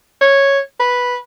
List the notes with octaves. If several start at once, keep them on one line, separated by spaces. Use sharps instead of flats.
C#5
B4